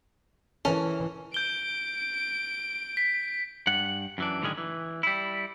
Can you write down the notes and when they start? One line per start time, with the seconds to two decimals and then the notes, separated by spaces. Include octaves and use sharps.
0.65 E3 C#4 A4 A#4
1.34 G6 D7 G7
2.97 B6
3.67 G2 F#5
4.18 F#2 E3 D4
4.42 A2 D3 D#3 G3 G#3 G#4
4.58 E3
5.03 G3 E4